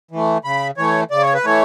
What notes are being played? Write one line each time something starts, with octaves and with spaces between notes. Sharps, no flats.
E3 A3
C#3 B5
E3 A3 C#5
C#3 D5
C#5
B4
E3 A3 C#5